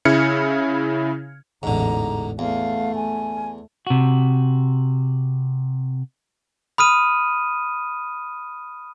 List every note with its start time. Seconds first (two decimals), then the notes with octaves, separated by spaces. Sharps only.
0.05 C#3 E4 F6 G#6 C#7
1.63 A1 E2 G#2 D3 A#5
2.39 E2 A3 F5
2.95 G#5
3.87 C3 F#4
6.78 B5 D#6 F6 D#7